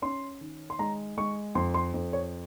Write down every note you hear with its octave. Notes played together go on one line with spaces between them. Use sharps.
C#4 C6
D#3
C6
G#3 A#5
G#3 C#6
F2 C6
C6
F2
C#5